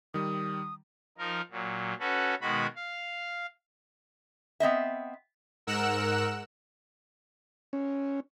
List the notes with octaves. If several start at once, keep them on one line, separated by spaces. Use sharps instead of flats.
D#3 G3 D#6
F3 D#4 A#4
A#2 F#3
C#4 F#4 A4 B4
B2 D#3 G#3 F#4 B5
F5
B3 C4 D#5 E5
G#2 A#4 F#5 E6 F#6 E7
C#4